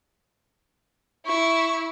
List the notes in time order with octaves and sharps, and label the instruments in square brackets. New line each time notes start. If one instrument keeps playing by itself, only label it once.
[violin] E4 [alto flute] C#6